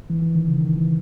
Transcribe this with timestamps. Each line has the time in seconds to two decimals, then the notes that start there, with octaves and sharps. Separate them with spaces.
0.10 E3
0.22 E3
0.35 D#3
0.48 C#3
0.60 D#3
0.76 E3